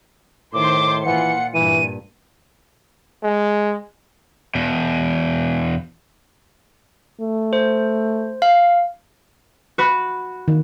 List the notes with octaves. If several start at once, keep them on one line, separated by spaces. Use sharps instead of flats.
A2 D#3 C5 C6 D6
A#2 E3 F4 F#5 C#7
G2 A#2 E3 D#7
G#3
E2 B2
A3
C5
F5
F#4 B4
D#3